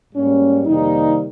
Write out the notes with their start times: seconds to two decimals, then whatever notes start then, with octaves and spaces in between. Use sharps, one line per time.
0.12 G#2 G3 A#3 C#4
0.66 F2 C3 D#3 G3 A#3 D#4